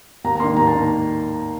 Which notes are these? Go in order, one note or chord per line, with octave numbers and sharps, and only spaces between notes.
D#2 A#5
A#5
D#3 A#3 C6
D#2 A#5
A5
D#3 A#3